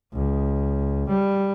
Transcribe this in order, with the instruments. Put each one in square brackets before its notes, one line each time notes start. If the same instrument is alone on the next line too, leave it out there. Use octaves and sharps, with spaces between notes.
[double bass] C#2
G3